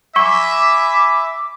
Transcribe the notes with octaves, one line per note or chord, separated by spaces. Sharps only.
E5 G#5 B5 C#6 D6